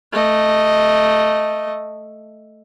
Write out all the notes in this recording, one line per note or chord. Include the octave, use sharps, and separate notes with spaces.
A3 D#5